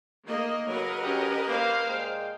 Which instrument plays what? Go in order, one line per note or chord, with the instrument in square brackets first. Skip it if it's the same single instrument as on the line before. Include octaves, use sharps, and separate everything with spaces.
[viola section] D#3 A#3 D#5
[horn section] C#3 F#3 [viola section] A#4 B4 D#5
[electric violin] C#4 G4
[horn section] A#3 [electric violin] C5 F5
[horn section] A#2 G#3 G5